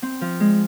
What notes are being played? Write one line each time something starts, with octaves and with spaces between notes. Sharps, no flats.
C4
F3
G#3